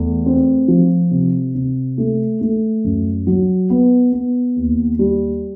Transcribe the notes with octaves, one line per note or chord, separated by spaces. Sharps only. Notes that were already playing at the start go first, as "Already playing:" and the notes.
Already playing: E2 A3
C4
F3
C3
C3
A3
A3
F#2
F#3
B3
B3
D#2
G3